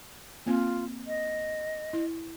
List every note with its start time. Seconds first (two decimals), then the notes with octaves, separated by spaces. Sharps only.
0.46 A#3 C4 F4
1.07 D#5
1.93 E4